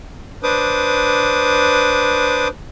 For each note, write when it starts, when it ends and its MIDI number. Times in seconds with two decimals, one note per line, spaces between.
0.43 2.48 62
0.43 2.48 71
0.43 2.48 72
0.43 2.48 86
0.43 2.48 87